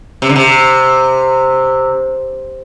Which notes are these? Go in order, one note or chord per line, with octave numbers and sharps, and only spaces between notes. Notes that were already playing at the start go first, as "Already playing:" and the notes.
C3
D3
C3